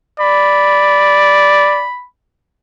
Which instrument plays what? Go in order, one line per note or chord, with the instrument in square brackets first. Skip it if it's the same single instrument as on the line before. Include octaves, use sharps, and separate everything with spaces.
[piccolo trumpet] D5 [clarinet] B5